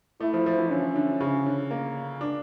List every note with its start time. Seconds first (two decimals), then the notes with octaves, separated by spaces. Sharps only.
0.20 A3 E4
0.33 F3
0.46 F3
0.59 E3
0.71 D3 C#4
0.96 D3
1.21 C#3
1.46 D3
1.71 A#3
2.21 D4